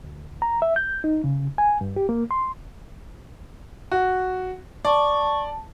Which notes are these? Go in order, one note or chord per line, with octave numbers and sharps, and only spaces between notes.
D2
A#5
E5
G6
D#4
C#3
G#5
G2
G4
A#3
C6
F#4
D5 A5 C#6